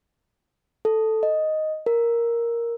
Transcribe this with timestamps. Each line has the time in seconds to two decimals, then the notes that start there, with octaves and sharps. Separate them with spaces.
0.85 A4
1.23 D#5
1.86 A#4